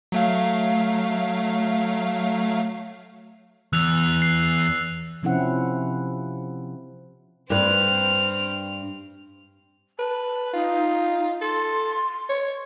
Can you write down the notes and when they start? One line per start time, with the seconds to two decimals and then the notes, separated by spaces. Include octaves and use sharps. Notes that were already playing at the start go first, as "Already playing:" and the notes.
0.12 F#3 A3 F5
3.73 E2 E6 F#6 F7
4.22 C7
5.23 C3 F3 C4 C#4 E4 F#5
7.50 G2 C4 B4 F6
9.99 B4 A5
10.54 D#4 F4
11.42 A4 C6
12.29 C#5